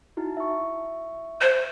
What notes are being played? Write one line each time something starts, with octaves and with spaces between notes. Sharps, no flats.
D#4 E4 F#4
E5 C#6
C5